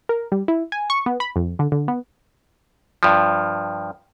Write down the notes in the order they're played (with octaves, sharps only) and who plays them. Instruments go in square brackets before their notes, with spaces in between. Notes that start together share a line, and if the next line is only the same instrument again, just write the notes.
[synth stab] A#4
G3
E4
G#5
C#6
B3
B5
F2
D3
D3
B3
[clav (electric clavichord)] G2 F3